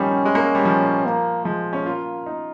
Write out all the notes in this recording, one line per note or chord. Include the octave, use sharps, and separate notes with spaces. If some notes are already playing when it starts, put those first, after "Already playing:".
Already playing: D#3 F3 G3 C#4
G#3
A#3
G3
F3
A#3
F3 G#3
C#4
A#3 F4
D#4